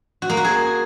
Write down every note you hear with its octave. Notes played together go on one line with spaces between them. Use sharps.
F#4
A#3
F#4
G#4